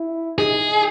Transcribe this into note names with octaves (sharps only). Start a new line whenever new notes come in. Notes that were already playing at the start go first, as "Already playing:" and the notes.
Already playing: E4
D#4 G#4